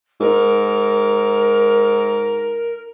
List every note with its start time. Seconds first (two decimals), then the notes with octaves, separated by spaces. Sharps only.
0.21 G#2 A#4